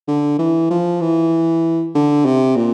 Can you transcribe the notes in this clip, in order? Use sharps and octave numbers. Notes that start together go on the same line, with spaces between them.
D3
E3
F3
E3
D3
C3
A#2